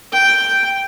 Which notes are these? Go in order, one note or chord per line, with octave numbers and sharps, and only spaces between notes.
G5